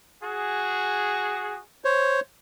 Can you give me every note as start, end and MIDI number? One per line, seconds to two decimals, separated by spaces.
0.22 1.60 66
0.22 1.60 68
1.84 2.20 72
1.84 2.20 73